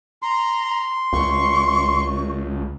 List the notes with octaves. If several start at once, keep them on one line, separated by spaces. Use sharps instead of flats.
A#5 C6
C#2 C#6